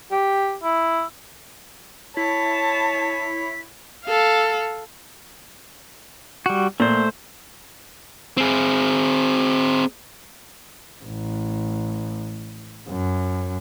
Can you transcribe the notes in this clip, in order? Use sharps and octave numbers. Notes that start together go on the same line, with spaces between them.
G4
E4
E4 C#5 A5 B6
A4 F5
G3 F#4
A#2 A3 C5
C4 G#4
A1
F#2